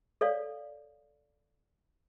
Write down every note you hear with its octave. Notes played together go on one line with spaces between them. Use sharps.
A4 C#5 D5 F5